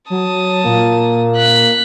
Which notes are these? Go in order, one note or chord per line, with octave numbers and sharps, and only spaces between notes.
F#3 A5 D#6
A#2 A#3
F#6 B6